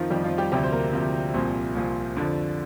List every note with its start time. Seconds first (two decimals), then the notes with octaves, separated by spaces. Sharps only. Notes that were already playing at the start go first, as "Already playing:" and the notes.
Already playing: F2 D#3 F3 D#4 F4
0.10 F2 D#3 G3 G4
0.24 F3 F4
0.38 G3 G4
0.52 D2 C3 F3 G3 G4
0.64 C5
0.72 A#3 A#4
0.93 D2 C3 F3
1.34 C2 A#2 F3 C4 C5
1.75 C2 A#2 F3
2.16 F2 D3 F3 D4 D5